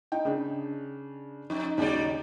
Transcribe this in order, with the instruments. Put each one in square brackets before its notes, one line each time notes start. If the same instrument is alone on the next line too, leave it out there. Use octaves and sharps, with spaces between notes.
[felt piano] D#4 D#5 G5
C#3 D4
[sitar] F2 [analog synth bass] D#4
[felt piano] D#2 C#3 [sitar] F#3 G3 D5